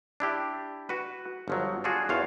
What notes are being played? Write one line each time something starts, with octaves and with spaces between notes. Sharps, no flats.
D4 E4 G4
F#4 B4
G1 F3 F#3
D4 F4 F#4 G#4
E2 F4 C5 C#5 F5